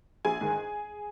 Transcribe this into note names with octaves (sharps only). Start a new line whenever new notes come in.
A#1 G#4 G#5
G#2 D#3